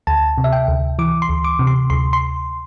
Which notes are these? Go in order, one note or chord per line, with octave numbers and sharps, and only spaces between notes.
D2 A5
C3
E5
G5
D2
E3 D6
C6
D2
D6
C3
C6
D2 C6
C6